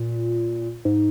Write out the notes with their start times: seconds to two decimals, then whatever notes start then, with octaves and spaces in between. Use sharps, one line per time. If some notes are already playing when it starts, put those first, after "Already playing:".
Already playing: A#2
0.85 G#2